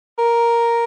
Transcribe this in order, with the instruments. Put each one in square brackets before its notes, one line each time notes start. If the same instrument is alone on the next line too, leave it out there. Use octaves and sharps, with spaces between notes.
[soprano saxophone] A#4